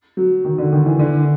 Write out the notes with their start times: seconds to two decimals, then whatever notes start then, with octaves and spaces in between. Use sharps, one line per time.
0.17 F#3
0.44 D#3
0.58 D3
0.73 D#3
0.86 E3
0.99 D3